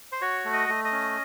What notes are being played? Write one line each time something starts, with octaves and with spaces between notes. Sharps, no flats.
C5
F#4 C#5
A3
D#5
A3
D#5
C#4